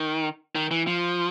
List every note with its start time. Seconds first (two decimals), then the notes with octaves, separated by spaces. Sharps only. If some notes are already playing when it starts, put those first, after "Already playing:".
Already playing: D#3
0.55 D#3
0.71 E3
0.87 F3